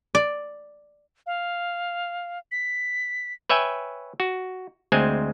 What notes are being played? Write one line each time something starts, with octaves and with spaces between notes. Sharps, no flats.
D5
F5
B6
B4 C#5 E5 G5 G#5
F#4
D2 G#3 C4 C5 G#5